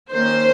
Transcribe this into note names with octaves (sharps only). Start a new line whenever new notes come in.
D#3 A#3 C#4 C5